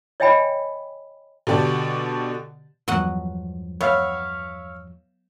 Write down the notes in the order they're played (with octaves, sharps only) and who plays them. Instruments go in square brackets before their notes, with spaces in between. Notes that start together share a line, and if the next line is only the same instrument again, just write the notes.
[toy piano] C#5 D#5 E5 G5 G#5 B5
[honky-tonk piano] B2 D3 G4 D5 A5
[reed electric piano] E2 G2 F3 [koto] F#3 D#5 F#5
[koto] B3 [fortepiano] C#5 E5 F5